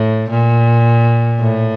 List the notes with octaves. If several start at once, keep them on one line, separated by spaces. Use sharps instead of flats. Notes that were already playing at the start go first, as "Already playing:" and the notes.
Already playing: A2
A#2
A2